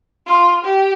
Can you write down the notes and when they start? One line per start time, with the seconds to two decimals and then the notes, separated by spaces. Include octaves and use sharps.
0.27 F4
0.64 G4